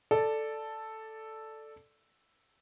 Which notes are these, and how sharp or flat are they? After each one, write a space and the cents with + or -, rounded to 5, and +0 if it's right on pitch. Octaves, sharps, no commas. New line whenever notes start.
A4 +0 D5 +5